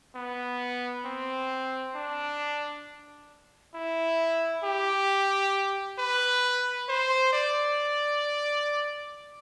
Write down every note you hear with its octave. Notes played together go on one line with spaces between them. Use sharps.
B3
C4
D4
E4
G4
B4
C5
D5